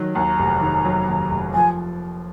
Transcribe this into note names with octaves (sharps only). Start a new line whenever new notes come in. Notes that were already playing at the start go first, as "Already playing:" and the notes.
Already playing: D#3 F#3
D#2 A#5
F1
D#3
F#3
D#2
F1
F3 G#5